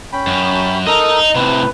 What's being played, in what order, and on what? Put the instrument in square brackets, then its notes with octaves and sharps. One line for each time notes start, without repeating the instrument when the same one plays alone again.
[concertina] C#4 G5 B5
[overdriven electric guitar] F#2
[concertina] A4 A#4 D#6 [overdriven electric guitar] D#5 A#5
[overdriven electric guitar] A2 C3 [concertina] B4